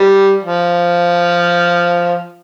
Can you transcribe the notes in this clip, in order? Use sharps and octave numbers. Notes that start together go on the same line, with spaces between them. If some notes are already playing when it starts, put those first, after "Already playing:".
Already playing: G3
F3